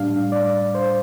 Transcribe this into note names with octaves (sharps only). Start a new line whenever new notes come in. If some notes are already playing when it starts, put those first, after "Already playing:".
Already playing: A2 G3 D4 F5
D5
C5